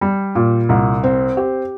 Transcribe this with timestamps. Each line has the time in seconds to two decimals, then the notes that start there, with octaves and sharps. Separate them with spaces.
0.01 G3
0.35 A#2
0.69 C2
1.04 C4
1.37 G4